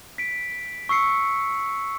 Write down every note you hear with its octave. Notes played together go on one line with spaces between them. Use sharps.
B6 D7
C#6 E6 C7 C#7